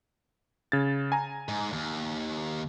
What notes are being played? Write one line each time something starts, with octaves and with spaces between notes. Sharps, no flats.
C#3 G#6 A6
G#5 A#5
G#2
D#2